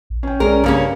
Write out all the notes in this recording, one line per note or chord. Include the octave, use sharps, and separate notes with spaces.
A#1
C#4 G5
B1 G#3 C#4 A#4 D5
G2 C#3 A#3 C#4